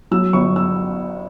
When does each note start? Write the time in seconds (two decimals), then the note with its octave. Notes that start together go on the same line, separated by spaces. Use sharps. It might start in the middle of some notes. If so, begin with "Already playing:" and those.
0.11 F#3 E6
0.33 G1 C#6
0.56 E6